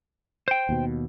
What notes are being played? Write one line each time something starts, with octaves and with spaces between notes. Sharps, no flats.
C5 G5
D#2 B2